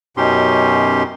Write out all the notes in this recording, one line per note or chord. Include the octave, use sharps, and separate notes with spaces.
F#2 B2 C#4 D#4 G4 C6